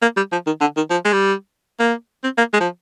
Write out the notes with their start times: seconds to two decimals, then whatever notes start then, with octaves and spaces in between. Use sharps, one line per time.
0.02 A#3
0.17 G3
0.32 F3
0.46 D#3
0.61 D3
0.77 D#3
0.90 F3
1.05 G#3
1.13 G3
1.80 A#3
2.24 C4
2.38 A#3
2.53 G#3
2.60 F3